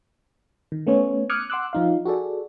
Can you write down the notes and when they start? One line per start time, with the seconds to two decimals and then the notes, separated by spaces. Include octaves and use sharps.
0.72 D#3
0.87 A3 B3 C#4 C#5
1.29 D6 D#6 F6 F#6 G#6 C#7
1.50 F#5 C6 D6 E6 F#6
1.73 F3 D#4 F5
2.05 F#4 G#4 A4 D5